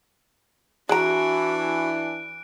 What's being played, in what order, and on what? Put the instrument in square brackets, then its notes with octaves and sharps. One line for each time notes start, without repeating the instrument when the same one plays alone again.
[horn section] E3 D4 [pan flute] F#4 [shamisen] G#4 A#5 [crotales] F#6 D7